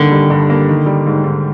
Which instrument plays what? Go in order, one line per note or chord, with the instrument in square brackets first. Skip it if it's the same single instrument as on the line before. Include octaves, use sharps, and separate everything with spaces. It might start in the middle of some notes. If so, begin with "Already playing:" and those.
Already playing: [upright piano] G2 D#3 G3 A#3 [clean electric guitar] D3
[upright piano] G3
G2
A#3
D#3
G3
G#2
G#2